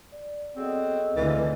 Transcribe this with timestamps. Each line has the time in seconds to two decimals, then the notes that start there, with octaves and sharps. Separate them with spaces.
0.12 D5
0.57 F#3 B3 C4 G#4 A4 D#5
1.17 D2 D3 E3 F3 G3 A#3